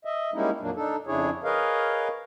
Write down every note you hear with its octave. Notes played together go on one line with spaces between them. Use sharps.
D#5 E5
G3 G#3 A#3 C#4 D#4 E4
F2 A#2 F#3 A#3 D4
D4 D#4 A4
F2 C#3 D4 E4 G#4 C#5
G#4 A#4 B4 C#5 D#5 F5